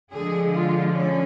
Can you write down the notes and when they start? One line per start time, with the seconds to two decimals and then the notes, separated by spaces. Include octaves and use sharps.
0.11 D3 F3 G#3 G#4
0.52 F4
0.93 C#4